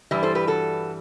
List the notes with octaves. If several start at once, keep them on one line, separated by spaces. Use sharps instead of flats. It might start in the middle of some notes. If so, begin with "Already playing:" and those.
G2 E3 G3 E4
A4 C5
G4 B4
F#4 A4